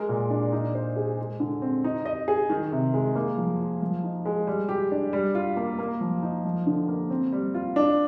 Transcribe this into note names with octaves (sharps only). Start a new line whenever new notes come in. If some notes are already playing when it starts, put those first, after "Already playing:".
Already playing: G#3 A#4
A#2
D4
D#4
C5
G#4
G#3
D3
C4
D#4
D#5
G#4
D#3
C3
G#3
A#3
F3
F4
F3
D#4
G#3
G3
G4
D4
G3
F4
A#3
A#3
F3
D#4
F3
D3
A#3
C4
G3
F4
D4